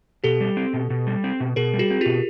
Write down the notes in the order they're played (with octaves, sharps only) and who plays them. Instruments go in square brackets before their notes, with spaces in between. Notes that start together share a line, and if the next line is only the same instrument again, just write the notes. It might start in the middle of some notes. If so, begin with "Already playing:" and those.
[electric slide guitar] B2 [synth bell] G4 A4
[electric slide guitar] G3
C4
B2
B2
G3
C4
B2
[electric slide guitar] B2 [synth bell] G#4 A#4
[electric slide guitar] G3
[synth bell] F#4 G#4
[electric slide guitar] C4
[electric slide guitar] B2 [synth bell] F4 G4